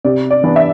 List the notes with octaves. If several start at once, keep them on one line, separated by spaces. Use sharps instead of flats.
C3 D5
D5
E3 B3 D4
E5